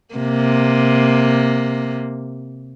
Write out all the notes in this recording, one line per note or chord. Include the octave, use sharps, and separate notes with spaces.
C3 A#3